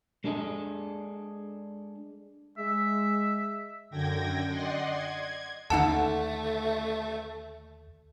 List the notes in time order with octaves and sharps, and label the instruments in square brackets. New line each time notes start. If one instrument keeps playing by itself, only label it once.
[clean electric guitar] G#3 D4 G#4 A4 D#5
[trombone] G#3 [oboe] E5
[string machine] F#2 D3 G5 G#6 A#6
D5 D#5 F#5 C6
G#6
[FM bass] D#2 [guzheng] D3 D4 A4 [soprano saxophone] A3 [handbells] D#4 F#5 A5